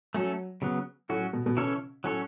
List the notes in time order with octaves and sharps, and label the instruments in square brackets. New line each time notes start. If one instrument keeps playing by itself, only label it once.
[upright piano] F#3 [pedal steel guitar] A3 C#4 A4
[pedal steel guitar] C#3 F#3 B3
[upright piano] A2 [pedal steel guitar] F#3 C#4 F#4
[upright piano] B2
B2
[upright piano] C#3 [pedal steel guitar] E3 C#4 A4 C#5
[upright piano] A2 [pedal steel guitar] F#3 C#4 A4 C#5